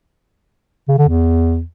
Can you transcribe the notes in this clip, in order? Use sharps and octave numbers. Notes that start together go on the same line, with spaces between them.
C#3
D3
E2